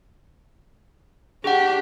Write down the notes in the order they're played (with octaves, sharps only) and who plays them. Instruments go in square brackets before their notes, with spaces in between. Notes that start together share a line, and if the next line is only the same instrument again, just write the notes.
[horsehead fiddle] D4 G4 [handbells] G#4 F#5